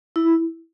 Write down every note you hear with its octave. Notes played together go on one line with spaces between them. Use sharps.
E4